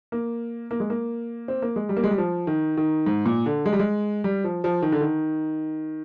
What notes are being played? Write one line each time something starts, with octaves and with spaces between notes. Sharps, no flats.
A#3
A#3
G#3
A#3
C4
A#3
G#3
G3
A#3
G#3
G3
F3
D#3
D#3
G#2
A#2
D3
G#3
G3
G#3
G3
F3
F3
D#3
D3
D#3